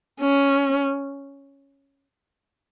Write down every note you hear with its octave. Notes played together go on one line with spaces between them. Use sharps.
C#4